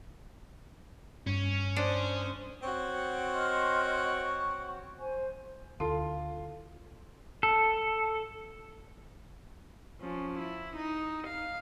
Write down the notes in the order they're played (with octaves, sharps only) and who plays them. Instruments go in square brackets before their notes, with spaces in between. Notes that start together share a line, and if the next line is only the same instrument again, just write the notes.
[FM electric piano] G2 [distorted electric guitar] C#4
[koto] D4 [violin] C5 D#6
[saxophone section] C4 F#4 C#5
[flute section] D#5 C6 F6
C#6
C5 G#5
[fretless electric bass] D2 [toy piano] E4 A4 A5 [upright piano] F4 C6
[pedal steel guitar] A4
[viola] F3 C#4
E4
D#4
F5